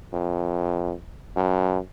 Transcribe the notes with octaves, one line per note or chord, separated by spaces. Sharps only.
F2
F#2